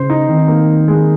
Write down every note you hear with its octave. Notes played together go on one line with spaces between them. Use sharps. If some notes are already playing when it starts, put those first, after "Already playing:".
Already playing: C#3 C5
D#4
D#3 C4
A#3
G#3